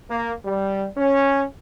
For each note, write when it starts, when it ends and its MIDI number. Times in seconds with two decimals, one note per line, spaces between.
0.10 0.34 58
0.45 0.88 55
0.98 1.45 61